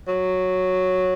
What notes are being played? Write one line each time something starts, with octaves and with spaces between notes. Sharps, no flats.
F#3